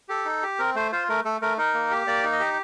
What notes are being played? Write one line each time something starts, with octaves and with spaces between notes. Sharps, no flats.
G4 A4
D#4
G4
C4 A#4
A3 C5
F4 C5
A3 A#4
A3 A4
A3 A#4
D#4 A#4
A#3
G4
A#3 D5
D#4
D#5
G4